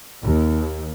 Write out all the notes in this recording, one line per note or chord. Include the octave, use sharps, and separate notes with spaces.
D#2